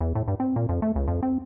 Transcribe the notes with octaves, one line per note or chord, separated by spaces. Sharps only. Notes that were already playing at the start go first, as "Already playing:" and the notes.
E2
A2
G2
C4
A#2
F2
A3
C#2
F2
C4